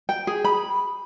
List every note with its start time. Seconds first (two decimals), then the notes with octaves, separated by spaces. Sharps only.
0.09 G5
0.27 G#4
0.44 B5